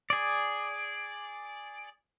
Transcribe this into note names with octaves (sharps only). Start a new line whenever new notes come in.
G#4 D5